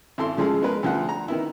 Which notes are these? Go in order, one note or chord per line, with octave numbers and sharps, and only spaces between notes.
G#1 E4 A4 C6
C#3 F3 G#3 G#4 A4
G#3 B3 A#4 B4
D2 F3 G3 F#5
A#5
D#3 B3 E4